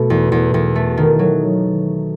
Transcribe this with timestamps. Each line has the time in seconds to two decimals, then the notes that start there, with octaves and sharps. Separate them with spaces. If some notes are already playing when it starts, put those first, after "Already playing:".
Already playing: B2 A3
0.10 E2
0.32 E2
0.54 E2
0.75 A3
0.97 D#3
1.19 F#3